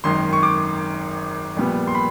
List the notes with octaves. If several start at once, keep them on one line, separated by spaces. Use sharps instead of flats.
G#1 F#2 D#3 C6
C#6
D6
A#1 A#2 G3 B3
C6
B5